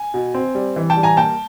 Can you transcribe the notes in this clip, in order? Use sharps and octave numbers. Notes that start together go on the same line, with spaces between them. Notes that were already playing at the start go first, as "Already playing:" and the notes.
Already playing: G#5
B2
C4
G3
E3
G5 A5
G3
G#5 A#5
A#3 G5 A5